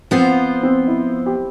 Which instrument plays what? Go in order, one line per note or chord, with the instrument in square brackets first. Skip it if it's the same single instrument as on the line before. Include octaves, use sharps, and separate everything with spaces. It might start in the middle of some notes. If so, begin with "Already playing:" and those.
[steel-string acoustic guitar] F3 B3 F4 C5 [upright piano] C4
[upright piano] C4
E4
G4